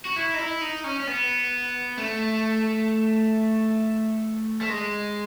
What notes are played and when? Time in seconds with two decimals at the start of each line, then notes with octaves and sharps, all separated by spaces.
0.05 F#4
0.16 E4
0.34 D#4
0.38 E4
0.61 D#4
0.84 C#4
1.00 C#4
1.07 B3
1.98 A3
4.61 A3
4.69 G#3